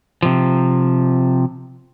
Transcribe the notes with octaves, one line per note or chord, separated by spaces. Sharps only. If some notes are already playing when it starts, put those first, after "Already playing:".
C3 F3